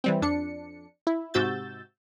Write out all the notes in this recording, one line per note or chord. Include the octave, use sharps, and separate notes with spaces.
E3 G3 C4
F2 D4 C#7
E4
G#2 C3 F#4 E6 G6 A6